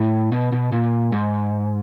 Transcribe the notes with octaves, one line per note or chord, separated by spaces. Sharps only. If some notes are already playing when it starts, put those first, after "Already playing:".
Already playing: A2
B2
B2
A#2
G#2